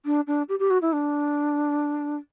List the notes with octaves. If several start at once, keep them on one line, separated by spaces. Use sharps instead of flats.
D4
D4
G4
G4
F#4
E4
D4